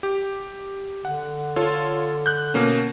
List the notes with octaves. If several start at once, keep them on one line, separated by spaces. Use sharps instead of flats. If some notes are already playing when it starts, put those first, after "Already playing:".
G4
D3 F#5
F4 A4 C#5
F#6 G6
B2 A#3 C#4